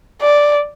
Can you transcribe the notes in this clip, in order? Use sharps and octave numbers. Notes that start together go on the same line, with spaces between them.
D5